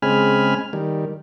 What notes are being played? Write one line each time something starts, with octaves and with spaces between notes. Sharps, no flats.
C#3 G#3 C4 G#5 B5 F6
D#3 G3